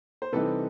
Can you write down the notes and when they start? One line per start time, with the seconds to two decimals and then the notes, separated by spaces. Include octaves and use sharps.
0.22 C5
0.32 C3 E3 G3 C4 D#4 A4 B4